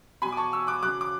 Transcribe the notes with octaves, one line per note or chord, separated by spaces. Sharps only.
B2 F#3 G#5 B5
D6
A5 C#6
C#6 E6
D6 F#6
C#3 F#3 D6 F#6
D6